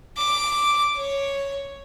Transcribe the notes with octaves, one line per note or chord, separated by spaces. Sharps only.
D6
C#5